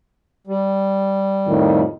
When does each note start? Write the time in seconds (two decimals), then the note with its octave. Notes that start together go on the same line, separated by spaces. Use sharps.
0.47 G3
1.46 F2 A2 D#3